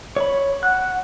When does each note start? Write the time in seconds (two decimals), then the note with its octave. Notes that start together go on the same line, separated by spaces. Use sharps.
0.16 C#5 B5
0.63 F#5 F#6